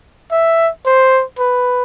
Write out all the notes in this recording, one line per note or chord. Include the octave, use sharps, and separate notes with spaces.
E5
C5
B4